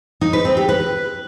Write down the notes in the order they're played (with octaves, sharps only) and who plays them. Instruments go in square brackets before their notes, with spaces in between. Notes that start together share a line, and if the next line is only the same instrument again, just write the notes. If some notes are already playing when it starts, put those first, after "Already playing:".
[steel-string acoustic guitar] D#4
B4
C4
G4
B4